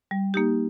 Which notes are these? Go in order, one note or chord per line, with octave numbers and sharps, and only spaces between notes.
G3
A#3 D#4 G4